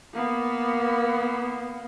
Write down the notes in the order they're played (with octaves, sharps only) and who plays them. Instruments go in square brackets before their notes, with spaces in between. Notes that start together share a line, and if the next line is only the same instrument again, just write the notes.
[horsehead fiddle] A#3 B3